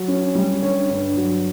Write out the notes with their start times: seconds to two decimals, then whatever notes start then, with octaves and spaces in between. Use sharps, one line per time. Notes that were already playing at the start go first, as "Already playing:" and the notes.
Already playing: F#3
0.08 C#4
0.35 G3
0.62 D3 C#5
0.89 G2
1.17 F#3